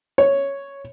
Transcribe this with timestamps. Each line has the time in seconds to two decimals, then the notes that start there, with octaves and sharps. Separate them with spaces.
0.18 C#5